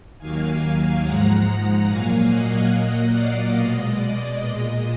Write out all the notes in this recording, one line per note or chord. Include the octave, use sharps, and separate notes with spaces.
D#2 D#3 F#3 A#3 F5 G#5
G#2 F3 G#3 F#5 A#5
A#2 F#3 A#3 F5 G#5
D#5 F#5
A#2 F#3 A#3
D5 F5
B2 G#3 D#5
D5
A#2 G#3 D#5